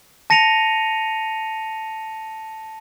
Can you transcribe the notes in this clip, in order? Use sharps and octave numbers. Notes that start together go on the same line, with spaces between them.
A5 A#6 C#7 D#7 F7